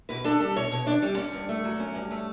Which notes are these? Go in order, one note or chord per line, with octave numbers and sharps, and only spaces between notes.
B2 B4
D4 A4
G3 A4
B2 C#5
B2
D4 D5
G3
C#4
G2
A3
F#3
C#4
G2
A3